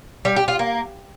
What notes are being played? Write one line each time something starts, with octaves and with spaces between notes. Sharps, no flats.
G3
G4
F4
A#3